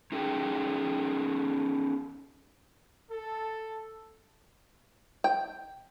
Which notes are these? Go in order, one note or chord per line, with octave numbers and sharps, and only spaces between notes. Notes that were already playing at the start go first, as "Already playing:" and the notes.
C#4 D#4 G#4 A4 G5
A4
G5